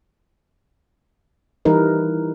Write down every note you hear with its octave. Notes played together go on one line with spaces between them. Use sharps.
E3 G3 D#4 A#4 B4